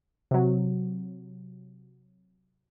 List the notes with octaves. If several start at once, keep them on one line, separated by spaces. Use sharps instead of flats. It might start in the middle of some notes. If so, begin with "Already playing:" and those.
C3 F#3